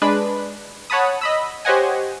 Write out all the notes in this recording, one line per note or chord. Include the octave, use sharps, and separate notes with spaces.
G#3 D4 B4 B5
C#5 F#5 A5 B5 D#6
D#5 B5 E6
G4 C5 C#5 D#5 F#5 G#5